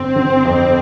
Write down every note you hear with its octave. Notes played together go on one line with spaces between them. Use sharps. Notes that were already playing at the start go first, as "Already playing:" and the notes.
Already playing: G1 D3 C4
D3
F2